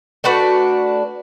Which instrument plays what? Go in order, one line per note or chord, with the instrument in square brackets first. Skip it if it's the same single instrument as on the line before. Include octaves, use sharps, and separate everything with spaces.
[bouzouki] A3 D4 F#4 B4